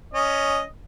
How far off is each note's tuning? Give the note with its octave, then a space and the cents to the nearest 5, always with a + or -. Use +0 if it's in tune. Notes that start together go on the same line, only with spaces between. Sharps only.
C#4 +5 D#5 -5